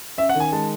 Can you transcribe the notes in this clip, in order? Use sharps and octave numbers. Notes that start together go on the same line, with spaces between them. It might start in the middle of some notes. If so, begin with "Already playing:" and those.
C#4 E5
F#5
D#3
G#5
G#3 A5